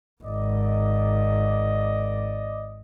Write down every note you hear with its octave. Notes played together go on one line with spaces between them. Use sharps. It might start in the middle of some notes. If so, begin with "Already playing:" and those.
G#1 D5 D#5